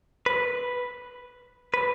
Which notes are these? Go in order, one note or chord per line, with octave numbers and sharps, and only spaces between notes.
B4
B4